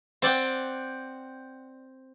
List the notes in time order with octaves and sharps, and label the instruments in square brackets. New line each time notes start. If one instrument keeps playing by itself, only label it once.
[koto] C4 D5 F#5 G5